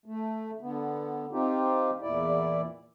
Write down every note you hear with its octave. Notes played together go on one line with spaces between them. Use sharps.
A3
D3 B3
C4 D#4 F4 G4
E2 A#2 E4 D5